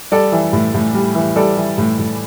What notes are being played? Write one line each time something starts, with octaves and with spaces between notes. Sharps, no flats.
G3 A4 D5
E3
A2
A2
G3
E3
G3 A4 D5
E3
A2
A2